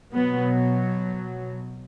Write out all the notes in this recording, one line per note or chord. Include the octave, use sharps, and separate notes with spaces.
B2 F#3 B3